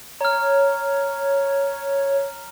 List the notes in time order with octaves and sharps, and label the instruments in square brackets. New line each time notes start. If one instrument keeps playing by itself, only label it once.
[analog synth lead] C#5 [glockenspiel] A#5 F6